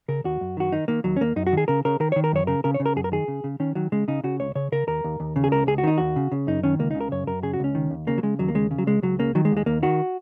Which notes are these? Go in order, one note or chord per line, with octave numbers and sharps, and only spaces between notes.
C#3 A#4
D#2 F#4
F#2
D#3 F#4
D#3 D#4
D#3 A#3
D#2 F#3
C#4
D#2 A#3
F#2 D#4
F#4
D#3 G#4
C#3 A#4
C#3 A#4
D#3 A#4
D#3 C#5
A#4
F#2 C#5
C#3 A#4
C#3 A#4
C#5
C#3
A#4
F#2 G#4
A#4
D#3 G#4
C#3
C#3
D#3 C#4
D#3 F#3
C#3 G#3
C#3 D#4
C#3 F#4
C#2 C#5
C#3 C#5
C#3 A#4
D#2 A#4
D#2
D#2
C#3
G#4
C#2 A#4
C#2 G#4
F#4
D#3 D#4
D#2 F#4
C#3
C#3
F#2 D#4
D#3 C#4
C#2 A#3
D#4
C#3
A#4
F#2 C#5
F#2 A#4
C#3 G#4
F#4
C#2 C#4
D#3
D#2
C#3 A#3
F#3
C#3 G#3
D#2 F#3
A#3
C#3 G#3
C#3
F#3
C#2 G#3
C#2 F#3
C#3 A#3
D#3 F#3
G#3
D#2
G#3
D#2 A#3
D#3 F#4